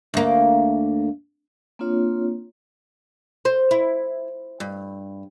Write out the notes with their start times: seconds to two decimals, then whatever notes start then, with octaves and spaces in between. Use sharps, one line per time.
0.14 D2 A#3
1.79 A#3 C4 D4 F4 C#5
3.45 C5
3.71 E4
4.60 G2